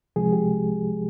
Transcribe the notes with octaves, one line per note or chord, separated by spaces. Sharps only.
C2 C3 F3 G#3 G#4
G4